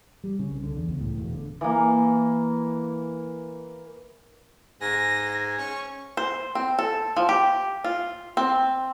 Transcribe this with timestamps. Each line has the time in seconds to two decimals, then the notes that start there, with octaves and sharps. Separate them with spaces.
0.24 G3
0.39 C#3
0.51 C2
0.63 D3
0.77 E2
0.88 C#2
1.00 A2
1.18 E1
1.34 D3
1.61 E3 A#3
4.81 G#2 G#5 A#6
5.59 C#4 C#6
6.17 C5
6.55 C4
6.79 A4
7.17 F3
7.29 G4
7.84 F4
8.37 C4